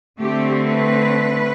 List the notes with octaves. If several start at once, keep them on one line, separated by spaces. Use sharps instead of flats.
D3 A3 C4 G4
B4